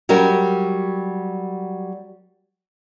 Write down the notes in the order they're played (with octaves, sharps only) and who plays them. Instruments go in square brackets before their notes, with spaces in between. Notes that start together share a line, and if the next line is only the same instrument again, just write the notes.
[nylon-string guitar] F#3 G3 C#4 G4 A#4